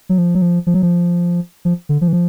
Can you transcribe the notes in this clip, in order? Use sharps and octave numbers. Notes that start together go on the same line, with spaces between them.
F#3
F3
F#3
F3
F3
F#3
F3
F3
D3
F3
E3
F3